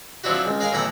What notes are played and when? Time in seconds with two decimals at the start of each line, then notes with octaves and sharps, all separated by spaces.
0.24 F3 F#3 C4 D4 E4 F#4
0.45 C#2
0.60 G#3 G#4 A#4 F5 G#5
0.72 B1 A2 E3 E4 A#5 B5